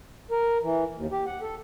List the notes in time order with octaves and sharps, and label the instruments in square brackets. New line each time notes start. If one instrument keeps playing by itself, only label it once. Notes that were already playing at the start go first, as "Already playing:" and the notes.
[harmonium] A#4
E3
D#2
G4
F#5
A4